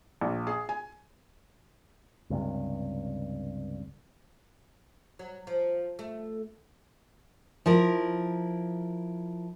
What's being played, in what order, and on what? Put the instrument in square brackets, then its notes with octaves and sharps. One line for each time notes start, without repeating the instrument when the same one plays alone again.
[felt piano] A#1
G#4
G#5
[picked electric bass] C#2 G2 C3
[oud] F#3
F3
A3
[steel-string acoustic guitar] F3 E4 A#4